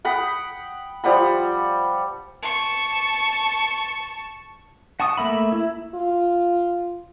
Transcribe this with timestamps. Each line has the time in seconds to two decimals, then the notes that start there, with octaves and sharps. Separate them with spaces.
0.05 F#5 G5 B5 D#6
1.04 F3 G3 F#5 B5
2.43 A5 C#6
5.00 F#5 A5 C#6 D#6
5.17 A3 A#3 E5 B5
5.52 E4
5.94 F4